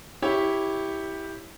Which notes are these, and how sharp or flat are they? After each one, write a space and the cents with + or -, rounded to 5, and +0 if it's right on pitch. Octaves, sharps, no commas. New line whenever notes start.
E4 -10 G4 +0 C#5 +0